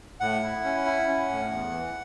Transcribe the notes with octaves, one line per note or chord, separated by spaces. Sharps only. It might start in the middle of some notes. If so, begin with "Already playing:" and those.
A2 F#5
E4
C#4
E4
C#4
A2
E2
E3